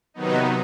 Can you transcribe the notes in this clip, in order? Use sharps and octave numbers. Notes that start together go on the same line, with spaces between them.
C3 D#3 F#3 B3 D#4